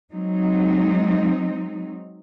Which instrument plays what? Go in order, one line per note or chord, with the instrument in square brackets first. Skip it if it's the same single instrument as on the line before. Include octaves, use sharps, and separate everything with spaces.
[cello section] F#3 G#3 C4 D#4